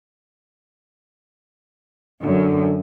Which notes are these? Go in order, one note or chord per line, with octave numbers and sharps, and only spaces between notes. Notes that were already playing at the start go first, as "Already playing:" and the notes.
F#2 D3